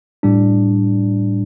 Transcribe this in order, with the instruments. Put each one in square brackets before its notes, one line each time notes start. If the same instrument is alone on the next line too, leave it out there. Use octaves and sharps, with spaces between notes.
[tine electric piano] A2 G3 D4